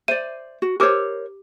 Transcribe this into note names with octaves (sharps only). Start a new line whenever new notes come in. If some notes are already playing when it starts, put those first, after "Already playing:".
C5 D5 E5 D#7
F#4
G4 A#4 C5 C#5 D6 E6